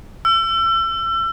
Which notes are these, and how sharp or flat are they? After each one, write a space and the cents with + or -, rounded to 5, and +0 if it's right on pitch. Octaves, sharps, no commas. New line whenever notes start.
E6 +35